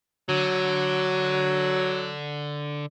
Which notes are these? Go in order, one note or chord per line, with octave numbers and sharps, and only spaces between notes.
D3 F#3